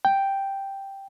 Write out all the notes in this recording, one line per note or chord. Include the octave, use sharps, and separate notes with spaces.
G5